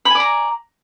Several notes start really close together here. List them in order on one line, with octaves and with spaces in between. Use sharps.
B5 G#5 D5 A#5